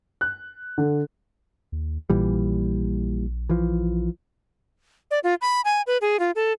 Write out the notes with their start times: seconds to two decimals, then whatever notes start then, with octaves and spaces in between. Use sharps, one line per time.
0.21 F#6
0.78 D3
1.72 D#2
2.10 A#1 A#2 E3 G3
3.49 E3 F3
5.11 D5
5.24 F4
5.42 B5
5.65 G#5
5.87 B4
6.01 G#4
6.20 F4
6.36 A4